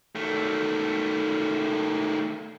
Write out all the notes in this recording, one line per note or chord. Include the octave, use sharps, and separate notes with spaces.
D#3 A3